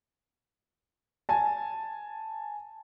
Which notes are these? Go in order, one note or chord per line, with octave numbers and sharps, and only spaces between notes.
G#5 A5